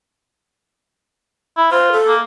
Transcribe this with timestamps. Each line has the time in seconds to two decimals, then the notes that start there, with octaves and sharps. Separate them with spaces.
1.57 E4
1.72 F4 C5
1.92 A4
2.08 A#3